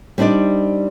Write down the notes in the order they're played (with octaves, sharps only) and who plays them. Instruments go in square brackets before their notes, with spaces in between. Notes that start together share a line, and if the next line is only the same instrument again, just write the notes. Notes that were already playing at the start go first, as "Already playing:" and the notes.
[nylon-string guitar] G3 C4 D4 D#4 D5